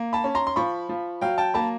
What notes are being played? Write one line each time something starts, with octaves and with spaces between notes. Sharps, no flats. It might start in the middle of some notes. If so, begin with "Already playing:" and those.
Already playing: A#3
A5 B5
C#4
A#5 C6
C6
F3 B5 C#6
F3
F#3 F5 G5
G5 A5
A#3 A5 B5